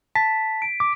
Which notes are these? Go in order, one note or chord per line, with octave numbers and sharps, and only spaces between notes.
A5 B6
D7
D6